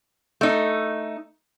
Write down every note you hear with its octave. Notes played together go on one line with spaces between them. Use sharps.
A3 D#4